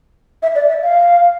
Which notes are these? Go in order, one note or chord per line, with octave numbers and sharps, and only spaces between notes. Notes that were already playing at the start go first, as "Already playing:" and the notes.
E5
D5
E5
F5